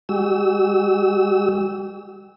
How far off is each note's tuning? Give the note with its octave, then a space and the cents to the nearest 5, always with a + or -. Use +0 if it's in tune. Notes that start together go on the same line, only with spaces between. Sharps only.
G#3 -45 F#4 +45 E6 -20